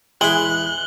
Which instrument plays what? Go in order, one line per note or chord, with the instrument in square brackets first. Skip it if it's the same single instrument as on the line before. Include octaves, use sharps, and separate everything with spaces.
[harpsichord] E2 E5 [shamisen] G#3 G#4 [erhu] F#6 [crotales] F#7 G7